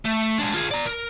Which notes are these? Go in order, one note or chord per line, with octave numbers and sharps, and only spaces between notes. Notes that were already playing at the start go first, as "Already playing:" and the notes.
A3
G#3 D4
F4 G#4
D5 A#5
A#4